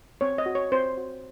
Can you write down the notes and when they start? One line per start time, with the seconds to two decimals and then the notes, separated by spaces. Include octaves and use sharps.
0.21 C4 C#5
0.38 D#5
0.46 F#4
0.55 C#5
0.72 C4 C5
0.97 F#4